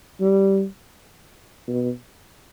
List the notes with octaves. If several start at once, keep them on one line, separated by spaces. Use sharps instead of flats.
G3
B2